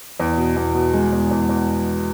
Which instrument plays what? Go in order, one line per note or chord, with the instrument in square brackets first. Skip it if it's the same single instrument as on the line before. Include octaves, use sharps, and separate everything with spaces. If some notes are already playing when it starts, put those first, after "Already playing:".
[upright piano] E2
B2
E2
B2
G#3
E2
E2
E2